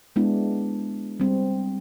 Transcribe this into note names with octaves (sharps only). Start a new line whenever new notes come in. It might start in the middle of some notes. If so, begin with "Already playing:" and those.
G#3 B3 D4 E4
G3 C4